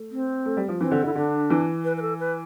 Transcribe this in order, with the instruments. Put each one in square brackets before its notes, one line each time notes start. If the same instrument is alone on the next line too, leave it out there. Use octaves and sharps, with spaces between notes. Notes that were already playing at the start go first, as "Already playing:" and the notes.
Already playing: [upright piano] A3
[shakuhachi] C4
[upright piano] A3
G3
F3
[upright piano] E3 [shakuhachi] C4
[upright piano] D3
[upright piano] D3 [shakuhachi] E4
[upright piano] D3 [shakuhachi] D4
[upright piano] E3
[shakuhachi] B4
B4
A4
B4